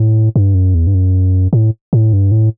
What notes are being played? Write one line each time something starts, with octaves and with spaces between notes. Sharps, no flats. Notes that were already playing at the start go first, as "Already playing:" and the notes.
Already playing: A2
G2
F#2
E2
G2
F#2
A2
A2
G2
A2